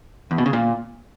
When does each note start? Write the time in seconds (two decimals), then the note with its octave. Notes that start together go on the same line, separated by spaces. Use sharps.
0.31 E2
0.38 B2
0.46 C#3
0.53 A#2